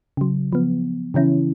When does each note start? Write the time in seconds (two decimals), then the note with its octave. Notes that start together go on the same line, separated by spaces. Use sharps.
0.17 C#3 F#3
0.53 F3 B3
1.14 C#3 E3 C#4 E4